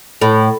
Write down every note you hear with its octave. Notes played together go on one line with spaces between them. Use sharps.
A2